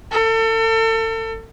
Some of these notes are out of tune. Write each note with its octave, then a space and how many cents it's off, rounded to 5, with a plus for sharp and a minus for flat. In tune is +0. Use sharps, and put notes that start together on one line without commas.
A4 +35